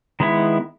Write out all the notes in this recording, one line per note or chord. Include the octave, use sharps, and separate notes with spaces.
D#3 G#3 B3 E4